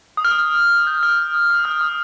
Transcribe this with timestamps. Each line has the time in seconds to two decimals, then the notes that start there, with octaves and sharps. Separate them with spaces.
0.17 D#6
0.25 F6
0.87 G6
1.03 F6
1.34 D#6
1.50 D#6
1.65 F6
1.81 D#6